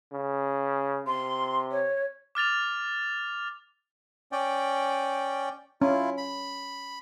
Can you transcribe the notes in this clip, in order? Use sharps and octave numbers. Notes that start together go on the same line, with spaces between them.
C#3
C3 C6
C#5
D6 F6 A6 F7
C#4 D5 G5
C#4 E4 F4
B5